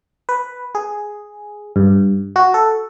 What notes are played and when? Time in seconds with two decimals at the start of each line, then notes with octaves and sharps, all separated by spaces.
0.29 B4
0.75 G#4
1.76 G2
2.36 F#4
2.54 A4